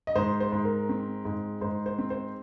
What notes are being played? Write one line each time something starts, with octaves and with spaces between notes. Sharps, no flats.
D#5
G#2 C5
C5
G#2
A#4
C4
G#2
G#2 C5
C5
C4
C5